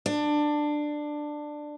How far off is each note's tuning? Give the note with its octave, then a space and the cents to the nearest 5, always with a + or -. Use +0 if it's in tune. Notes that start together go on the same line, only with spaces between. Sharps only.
D4 +15